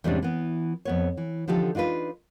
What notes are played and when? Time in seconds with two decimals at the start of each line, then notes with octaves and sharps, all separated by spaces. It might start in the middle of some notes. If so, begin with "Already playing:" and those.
0.04 E2 G#2 C3 G3 C#4 D4
0.23 E3 B3
0.85 F2 B3 C#5
1.17 E3
1.48 D3 F3 D#4 G4 A4
1.75 D4 D#4 F4 G4 B4